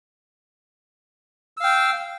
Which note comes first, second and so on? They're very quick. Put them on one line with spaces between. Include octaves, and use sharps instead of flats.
E6 F5 G5